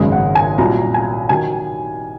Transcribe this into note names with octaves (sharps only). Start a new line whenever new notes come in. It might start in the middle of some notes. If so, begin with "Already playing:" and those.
Already playing: G#1 F#2 C#3 G#3
F#5
G#5
C2 A#2 F#3 A#5
G#5
D#3 F#3 G#5